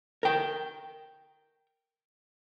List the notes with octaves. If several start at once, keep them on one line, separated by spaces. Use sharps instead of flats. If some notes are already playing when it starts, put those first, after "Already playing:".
A#4 G5